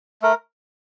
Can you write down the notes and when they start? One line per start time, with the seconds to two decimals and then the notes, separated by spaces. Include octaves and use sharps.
0.22 A3 A#4